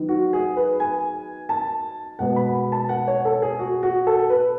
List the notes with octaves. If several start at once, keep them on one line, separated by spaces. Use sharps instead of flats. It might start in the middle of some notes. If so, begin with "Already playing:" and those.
Already playing: D#3 F#3 B3
F#4
G#4
B4
G#5
A5
B2 G#3 B3 F#5
B5
A5
F#5
C#5
A4
G#4
F#4
F#4
A4
B4